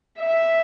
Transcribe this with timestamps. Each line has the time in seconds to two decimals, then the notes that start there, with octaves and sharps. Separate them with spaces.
0.20 E5